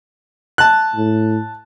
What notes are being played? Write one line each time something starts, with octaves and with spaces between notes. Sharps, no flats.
A5 F#6
A2